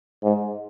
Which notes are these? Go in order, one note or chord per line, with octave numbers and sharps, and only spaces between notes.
G#2